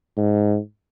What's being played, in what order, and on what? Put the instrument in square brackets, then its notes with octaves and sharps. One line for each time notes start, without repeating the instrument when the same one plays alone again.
[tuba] G#2